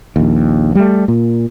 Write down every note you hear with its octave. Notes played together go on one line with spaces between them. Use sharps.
A#1 D#2
G3 A3
A#2